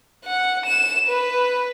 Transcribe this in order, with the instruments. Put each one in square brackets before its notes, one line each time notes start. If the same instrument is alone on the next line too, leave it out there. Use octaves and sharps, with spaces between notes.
[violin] F#5
E7
B4